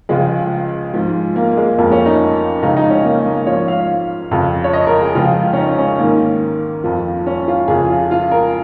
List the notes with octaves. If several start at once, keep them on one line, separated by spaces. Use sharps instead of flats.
C#2 C#3 F3 G#3
G#2 F3
A#3
A#3
G#3
F2 F3 A#3
C#4
D#4
C#2 C#3 F3 D#4
D#4
C#4
A#3
A#3
G#2 F3 C#5
F5
F2 C#3 F3
C#5
D#5
A#4
G#4
C#2 C#3 F3 F4
C#4
D#4
C#4
G#2 D#3 A#3
F2 F3
C#4
F4
F2 C#3 F3 G#4
F4
F4
A#4